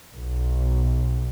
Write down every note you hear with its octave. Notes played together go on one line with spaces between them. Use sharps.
B1